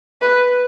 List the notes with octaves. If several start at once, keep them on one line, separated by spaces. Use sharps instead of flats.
B4